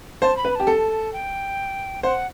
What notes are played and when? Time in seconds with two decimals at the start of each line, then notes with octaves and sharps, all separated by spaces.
0.22 C5 A5
0.37 B5
0.45 B4
0.52 B5
0.55 G4 A5
0.67 A4
1.13 G5
2.03 C5 F#5